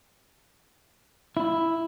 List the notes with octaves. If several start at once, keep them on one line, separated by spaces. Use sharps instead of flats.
E4